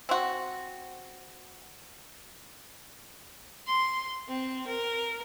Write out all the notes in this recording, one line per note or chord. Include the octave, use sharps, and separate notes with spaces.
C4 F#4
C6
C4
A#4